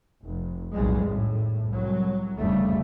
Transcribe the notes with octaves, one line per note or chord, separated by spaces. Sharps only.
F1
B1 F2 A2 G3 G#3
G#1 A2
C2 F#3
F1 D2 C#3 G3 A3